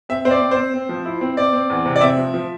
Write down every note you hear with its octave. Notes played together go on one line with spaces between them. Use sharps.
C4 E5
C4 C5
D5
C4
C5
C4
C4
F3
E4
C4
C4 D5
C4
E2
C3
D5
C4 E5
F3
F3